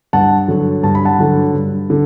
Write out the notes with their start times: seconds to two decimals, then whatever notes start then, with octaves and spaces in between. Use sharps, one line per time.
0.13 G2 F#5 A5
0.48 D3 F#3
0.83 G2 A5
0.95 B5
1.05 F#5 A5
1.19 D3 F#3
1.54 G2
1.90 D3